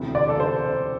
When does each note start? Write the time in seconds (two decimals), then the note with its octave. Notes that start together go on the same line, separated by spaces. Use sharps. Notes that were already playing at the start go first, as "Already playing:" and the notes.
Already playing: E1 D2 C3 E3
0.15 D5
0.29 A4
0.40 C5